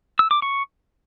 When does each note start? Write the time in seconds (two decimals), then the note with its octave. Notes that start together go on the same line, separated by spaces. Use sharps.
0.19 E6
0.31 D6
0.42 C#6